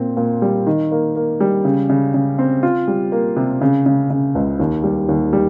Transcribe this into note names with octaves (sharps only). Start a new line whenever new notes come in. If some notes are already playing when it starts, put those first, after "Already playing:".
Already playing: A#2 C4
A#2
G3
D#3
A#3
A#3
G3
C#3
C#3
C#3
C4
F4
G3
A#3
C3
C#3
C#3
C#3
C#2
D#2
G3
D#2
G3